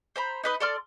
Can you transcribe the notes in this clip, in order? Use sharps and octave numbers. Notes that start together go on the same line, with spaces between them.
C5 A#5 B5
D#4 B4 D#5
A4 D5 C6 F6